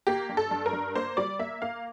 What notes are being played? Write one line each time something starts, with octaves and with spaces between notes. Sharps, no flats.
A#3 G4
G2
A4
G2
A#4
G2
A#3 C5
G3 D5
A#3 E5
A#3 F5